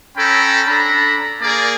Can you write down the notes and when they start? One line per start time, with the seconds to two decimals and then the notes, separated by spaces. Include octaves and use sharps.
0.17 C#4 A4 G5 A#5 B5
0.68 D4 A4 A#5 B5
1.42 A#3 G#4 A#4 D5